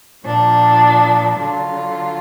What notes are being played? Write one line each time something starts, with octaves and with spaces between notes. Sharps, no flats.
A#2 F3 D4
D3 F#3 F4